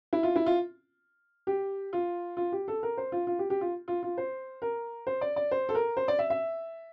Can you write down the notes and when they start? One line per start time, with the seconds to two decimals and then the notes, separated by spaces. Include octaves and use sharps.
0.13 E4
0.23 F4
0.36 E4
0.46 F4
1.47 G4
1.93 F4
2.37 F4
2.52 G4
2.68 A4
2.83 A#4
2.98 C5
3.12 F4
3.27 F4
3.39 G4
3.50 G4
3.61 F4
3.88 F4
4.03 F4
4.18 C5
4.62 A#4
5.07 C5
5.21 D5
5.36 D5
5.51 C5
5.69 A4
5.75 A#4
5.97 C5
6.08 D5
6.19 E5
6.30 E5